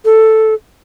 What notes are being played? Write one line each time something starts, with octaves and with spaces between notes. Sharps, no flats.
A4